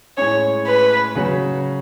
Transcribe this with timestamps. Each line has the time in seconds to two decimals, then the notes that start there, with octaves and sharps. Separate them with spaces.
0.17 A2 G#3 C#4 G#4 C#5
0.67 B4
1.15 C#3 F#3 C#4 F#4